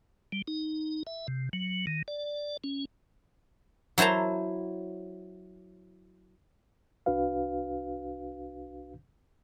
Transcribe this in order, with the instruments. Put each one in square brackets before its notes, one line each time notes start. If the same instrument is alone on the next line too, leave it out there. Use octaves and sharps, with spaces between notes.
[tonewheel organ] G3
D#4
E5
C3
F#3
D#3
D5
C#4
[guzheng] F#3 E4 C5 A5 A#5
[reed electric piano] C2 D4 F#4 B4 F5